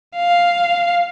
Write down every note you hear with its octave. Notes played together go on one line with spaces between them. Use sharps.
F5